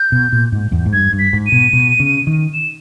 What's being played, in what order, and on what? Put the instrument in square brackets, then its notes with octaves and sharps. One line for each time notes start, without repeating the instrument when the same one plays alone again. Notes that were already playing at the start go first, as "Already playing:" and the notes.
Already playing: [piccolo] G6
[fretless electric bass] B2
A#2
G#2
E2
G#2
[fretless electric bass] G2 [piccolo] G#6
[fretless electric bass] G2
[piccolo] B6
[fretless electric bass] G#2
[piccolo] D#7
[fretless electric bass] B2
B2
C#3
D#3
[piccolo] E7